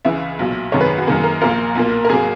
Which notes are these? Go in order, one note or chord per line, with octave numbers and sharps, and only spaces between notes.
C#2 C#3 E3 E5
B1 A#2 F#3
G#1 F#2 D#3 G#3 C#5
B4
F#4
F#2 D#3 A#3 G#4
A#4
A#1 A#2 A#3 A#4
B1 A#2 A#3
A#4
G#1 F#3 A#3 G#4